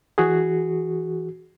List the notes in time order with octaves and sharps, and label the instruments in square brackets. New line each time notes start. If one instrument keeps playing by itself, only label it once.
[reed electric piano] E3 F#4 G#4